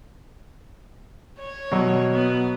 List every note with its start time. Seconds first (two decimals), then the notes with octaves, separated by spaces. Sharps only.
1.39 C#5
1.71 B2 F#3
2.13 B3